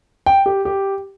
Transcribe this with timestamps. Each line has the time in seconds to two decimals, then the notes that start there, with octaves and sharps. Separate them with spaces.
0.26 G5
0.46 G4
0.65 G4